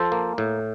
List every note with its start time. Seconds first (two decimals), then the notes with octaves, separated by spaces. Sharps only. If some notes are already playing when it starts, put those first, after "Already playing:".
Already playing: F3 A4 C5
0.12 A#3
0.38 A2